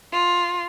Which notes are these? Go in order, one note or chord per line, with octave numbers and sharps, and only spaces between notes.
F4